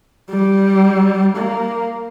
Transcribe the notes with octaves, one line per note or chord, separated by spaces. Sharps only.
G3
A#3